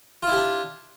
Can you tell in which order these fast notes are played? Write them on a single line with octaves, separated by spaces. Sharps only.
F4 E4 G4 D4